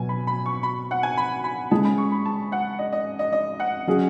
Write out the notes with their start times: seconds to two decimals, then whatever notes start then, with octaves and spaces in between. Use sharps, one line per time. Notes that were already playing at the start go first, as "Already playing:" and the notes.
Already playing: B2 F#3 G#5
0.09 B5
0.27 B5
0.46 C#6
0.63 B5
0.91 F#5
1.03 G#5
1.17 B5
1.44 B5
1.71 G#3 C#4 G#4 A5
1.85 B5
1.98 C#6
2.12 B5
2.25 A5
2.52 F#5
2.79 D#5
2.93 D#5
3.19 D#5
3.32 D#5
3.60 F#5
3.87 F#3 C#4 G#4